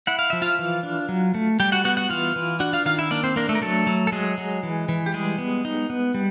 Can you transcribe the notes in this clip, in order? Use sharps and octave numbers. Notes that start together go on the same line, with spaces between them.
E4 F#5
F5
F3 E5
F4 F5
E3
D4
F#3
A3
G3 G4 G5
F#4 F#5
B3 F#4 F#5
F#4 F#5
E3 F4 F5
E3
D4 F#4 F#5
F4 F5
D#3 F4 F5
E4 E5
A#3 D4 D5
C4 C5
A#3 D4 A#4
A3 A4
A#4
F#3 A3 A4
F#3
A4
F#3 G#3 G#4
F#3
E3
E3
G4
G3 G#3 G#4
B3
D#4
B3
G3